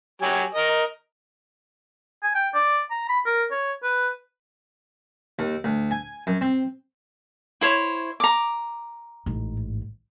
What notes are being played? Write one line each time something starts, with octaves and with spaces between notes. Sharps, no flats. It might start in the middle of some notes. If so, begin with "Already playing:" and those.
F#3 G4 G#5
A#4 D#5
G#5
G5
D5
A#5
B5
A#4
C#5
B4
D#2
D2
G#5
F#2
C4
E4 C5 C#5
A#5 D6
A1 G#2